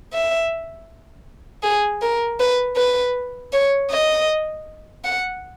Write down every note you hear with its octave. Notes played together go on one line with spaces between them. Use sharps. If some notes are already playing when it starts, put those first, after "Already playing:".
E5
G#4
A#4
B4
B4
C#5
D#5
F#5